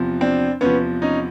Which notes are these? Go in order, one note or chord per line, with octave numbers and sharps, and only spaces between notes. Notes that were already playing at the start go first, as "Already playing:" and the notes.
Already playing: E2 C3 F3
C4 D4
E2 C3 F3 B3 C#4
C#4 D#4